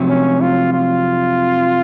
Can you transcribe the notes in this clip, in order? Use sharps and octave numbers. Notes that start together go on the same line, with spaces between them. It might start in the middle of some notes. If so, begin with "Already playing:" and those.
Already playing: F2 C3 F#3
C#4
F4
F4